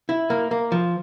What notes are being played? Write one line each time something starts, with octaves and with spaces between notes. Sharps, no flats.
E4
A#3
A#3
F3